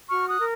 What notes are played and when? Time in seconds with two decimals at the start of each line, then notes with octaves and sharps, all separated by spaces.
0.09 F#4 C#6 F6
0.28 D#6 F#6
0.38 A#4